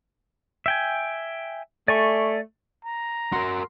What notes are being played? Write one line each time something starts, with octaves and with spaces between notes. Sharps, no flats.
E5 G5 G#5
A3 D5 G#5 C#6
A#5
F#4 A#4 C6